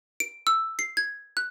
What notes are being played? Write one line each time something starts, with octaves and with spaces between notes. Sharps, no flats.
D7
E6
C7
G#6
F#6